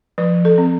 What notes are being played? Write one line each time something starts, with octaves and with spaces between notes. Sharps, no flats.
F3 B4
A4
C4